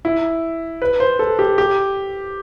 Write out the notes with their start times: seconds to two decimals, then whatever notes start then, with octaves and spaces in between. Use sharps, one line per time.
0.05 E4
0.82 B4
1.00 C5
1.19 A4
1.39 G4
1.58 G4